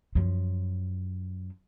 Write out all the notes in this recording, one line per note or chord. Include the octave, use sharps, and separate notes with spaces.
F#2 F3